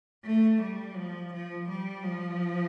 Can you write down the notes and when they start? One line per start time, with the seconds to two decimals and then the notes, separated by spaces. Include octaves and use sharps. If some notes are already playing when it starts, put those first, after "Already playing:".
0.25 A3
0.61 G3
0.97 F3
1.33 F3
1.68 G3
2.04 F3